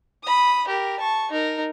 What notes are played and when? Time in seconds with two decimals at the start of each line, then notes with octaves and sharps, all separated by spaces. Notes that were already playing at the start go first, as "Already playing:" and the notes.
0.23 B5 D#6
0.67 G4 A#4
1.00 A5 C#6
1.31 D#4 A#4